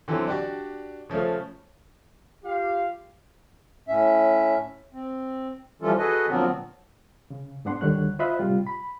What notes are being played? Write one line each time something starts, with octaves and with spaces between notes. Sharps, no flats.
D3 E3 F#3 C4
D4 F#4 G4 D5
C#3 F3 A3 C#4
F4 G4 F5
A2 C#4 E5
C4
E3 F3 G3 C#4 F4 A4
F#4 G#4 A4 B4 D#5 G#5
A#2 D3 F3 F#3 B3 C4
C#3
G#2 B3 D4 F#5 C6
D2 D3 D#3 G3 C#5 F#6
F4 C5 D#5 E5 B5 F#6
A2 C3 G3 F4
B5